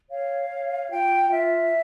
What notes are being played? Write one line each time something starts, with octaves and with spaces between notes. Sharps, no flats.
C#5 F5
C#5
F4 G5
F4 E5